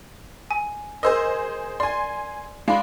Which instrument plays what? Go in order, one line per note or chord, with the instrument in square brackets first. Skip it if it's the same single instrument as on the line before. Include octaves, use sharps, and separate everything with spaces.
[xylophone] G#5
[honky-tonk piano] G#4 C5 D#5 [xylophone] A#4 E6
[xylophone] D5 [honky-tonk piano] G#5 C6
[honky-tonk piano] G#3 D4 [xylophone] F5 B5